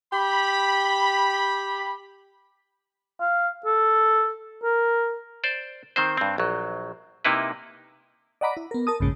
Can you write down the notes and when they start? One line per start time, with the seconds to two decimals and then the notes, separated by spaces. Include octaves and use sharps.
0.12 G4 B5
3.20 F5
3.66 A4
4.63 A#4
5.44 C5 D5
5.96 D#3 C4 C5
6.17 G2 C4
6.38 A#1 F#3
7.25 C3 A#3 D#4 E4 B4
8.41 D5 D#5 F#5 A#5 B5 D6
8.57 E4
8.71 B3 A#4
8.87 A#4 A5 D#6
9.00 A#1 F2 G#2 C#3 G#3